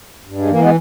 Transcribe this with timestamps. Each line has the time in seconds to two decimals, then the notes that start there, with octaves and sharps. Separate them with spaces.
0.25 G2
0.38 G#3
0.49 E3 A#3
0.61 G#3 B3